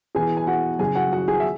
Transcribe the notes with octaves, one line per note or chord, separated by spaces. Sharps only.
E2 B2 B3 E4 G#4 G#5
G#5
F#4 F#5
F#2 C#3 F#3 G#4 G#5
F#4 F#5
F#4 F#5
G#4 G#5
E5